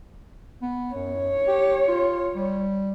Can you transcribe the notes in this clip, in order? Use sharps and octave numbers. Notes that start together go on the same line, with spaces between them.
B3
F#2 C#5
G4
F4
G3